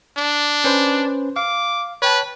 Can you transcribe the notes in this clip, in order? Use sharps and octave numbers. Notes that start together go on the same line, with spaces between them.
D4
C#4 B4 C5
F5 D6
B4 C#5 G5 A5